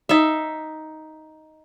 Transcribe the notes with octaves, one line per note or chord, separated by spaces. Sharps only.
D#4 E5